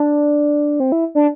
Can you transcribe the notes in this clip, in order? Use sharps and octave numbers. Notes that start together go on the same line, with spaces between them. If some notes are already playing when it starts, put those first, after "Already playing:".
Already playing: D4
C4
E4
D4